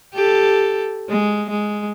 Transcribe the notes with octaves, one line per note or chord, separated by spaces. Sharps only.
G4 A4
G#3
G#3